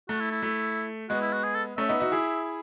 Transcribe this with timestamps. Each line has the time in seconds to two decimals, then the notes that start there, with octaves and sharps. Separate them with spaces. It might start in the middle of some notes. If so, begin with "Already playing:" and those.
0.09 A3 F#4
0.20 E4
0.32 E4
0.43 A3
1.10 G#3 B3 F#4
1.22 E4
1.33 F#4
1.44 G#4
1.55 A4
1.78 A3 C#4 E5
1.89 B3 D#4
2.00 D#4 F#4
2.12 E4 G#4